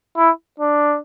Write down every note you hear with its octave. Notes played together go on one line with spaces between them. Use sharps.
E4
D4